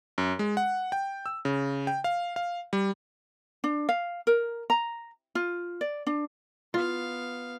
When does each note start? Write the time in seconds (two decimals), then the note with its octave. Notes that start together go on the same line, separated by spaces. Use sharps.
0.18 F#2
0.39 G#3
0.57 F#5
0.92 G5
1.26 E6
1.45 C#3
1.87 G5
2.04 F5
2.36 F5
2.73 G3
3.64 D4
3.89 F5
4.27 A#4
4.70 A#5
5.35 F4
5.81 D5
6.07 D4
6.74 B3 F4 F5